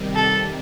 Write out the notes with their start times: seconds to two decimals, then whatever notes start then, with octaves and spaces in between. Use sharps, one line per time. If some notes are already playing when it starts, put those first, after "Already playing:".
Already playing: C3 D#3 G3
0.15 A4